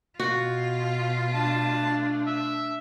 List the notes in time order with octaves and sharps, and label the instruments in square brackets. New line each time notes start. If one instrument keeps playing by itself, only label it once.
[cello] B2 F4 [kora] F#4
[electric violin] A3 D4 [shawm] A5
[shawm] E5